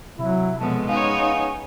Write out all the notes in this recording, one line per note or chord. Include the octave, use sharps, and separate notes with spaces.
C3 F#3 E4
F#2 B2 F3 G#3 A4
B3 C#4 D#4 G#4 C#5 F5